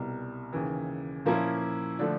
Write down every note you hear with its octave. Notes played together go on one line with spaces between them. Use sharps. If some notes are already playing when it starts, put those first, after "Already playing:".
Already playing: C2 B2 G3
D#2 C#3 E3
A#2 F3 A#3 C#4 E4
D3 F3 A3 D4